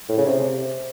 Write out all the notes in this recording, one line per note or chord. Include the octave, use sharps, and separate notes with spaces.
A2
C#3
C3